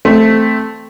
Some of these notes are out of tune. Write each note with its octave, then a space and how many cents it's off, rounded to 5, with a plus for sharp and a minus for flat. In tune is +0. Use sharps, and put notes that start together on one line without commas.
A3 +0 C4 +0